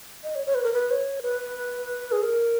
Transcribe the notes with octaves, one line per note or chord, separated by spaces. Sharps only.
D#5
C#5
C#5
B4
A#4
B4
C#5
B4
G#4
A#4